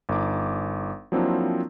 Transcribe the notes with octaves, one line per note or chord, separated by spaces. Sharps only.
G1 D#4 D6
F3 F#3 A#3 C4 D4 E4